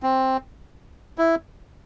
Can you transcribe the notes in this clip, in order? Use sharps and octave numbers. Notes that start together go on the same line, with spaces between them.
C4
E4